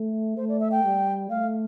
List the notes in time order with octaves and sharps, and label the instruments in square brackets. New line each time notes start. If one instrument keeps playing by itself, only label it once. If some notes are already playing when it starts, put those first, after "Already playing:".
Already playing: [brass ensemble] A3
[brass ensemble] A3 [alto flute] C5
[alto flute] D5
E5
G5
[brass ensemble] G3
[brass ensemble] A3 [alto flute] F5